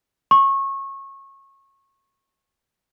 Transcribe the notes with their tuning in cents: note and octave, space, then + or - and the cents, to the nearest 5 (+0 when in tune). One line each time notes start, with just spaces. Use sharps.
C#6 -25